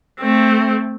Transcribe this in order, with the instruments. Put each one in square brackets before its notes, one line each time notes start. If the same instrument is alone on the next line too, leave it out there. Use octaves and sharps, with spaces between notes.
[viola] A3 C4